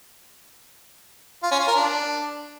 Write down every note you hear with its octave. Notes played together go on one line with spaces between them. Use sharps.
F4
C#4
F4
A#4
D4